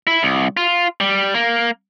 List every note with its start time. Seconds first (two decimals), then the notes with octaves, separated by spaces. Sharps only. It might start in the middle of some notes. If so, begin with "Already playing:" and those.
0.07 E4
0.23 C2
0.57 F4
1.00 G3
1.35 A#3